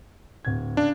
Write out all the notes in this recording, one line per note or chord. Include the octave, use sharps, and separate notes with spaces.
D1 G#6
C#3 D4